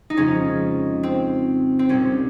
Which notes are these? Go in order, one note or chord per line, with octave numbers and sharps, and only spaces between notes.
D#4
F2 C#3 F3 G#3 C#4
C4
C4
C2 A#2 G3 C#4